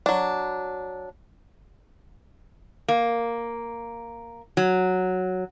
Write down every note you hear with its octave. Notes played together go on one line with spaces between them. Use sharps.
F#3 D4
A#3
F#3